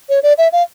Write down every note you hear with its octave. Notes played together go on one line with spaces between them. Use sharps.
C#5
D5
E5
F5